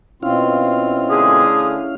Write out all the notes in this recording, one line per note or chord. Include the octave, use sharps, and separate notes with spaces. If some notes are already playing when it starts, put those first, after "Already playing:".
B2 C4 C#4 E4 F4 F5
D3 A3 G#4 D#6